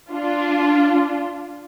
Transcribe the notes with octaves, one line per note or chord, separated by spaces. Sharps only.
D4 F4